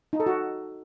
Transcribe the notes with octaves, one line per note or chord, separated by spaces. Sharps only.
D#4
A4
F#4